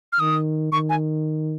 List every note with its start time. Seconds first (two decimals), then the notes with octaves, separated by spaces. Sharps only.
0.13 F6
0.20 D#3 D#6
0.72 D#3 C#6
0.89 G#5